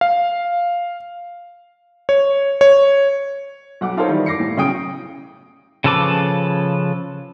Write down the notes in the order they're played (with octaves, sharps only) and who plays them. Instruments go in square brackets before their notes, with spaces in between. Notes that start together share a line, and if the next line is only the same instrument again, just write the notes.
[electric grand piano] F5
C#5
C#5
[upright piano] B1 F#5 D6
D#4 F4 A4 A#4 C5 C#5
D#3 E3 G3 E4 D5
D6 A#6 C7 C#7
A2
B1 C#3 C#4 G5 D#6 D7
[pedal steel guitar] C#3 F3 A4 B4 D6